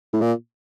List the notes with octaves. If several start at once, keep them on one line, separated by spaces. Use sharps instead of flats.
A2
A#2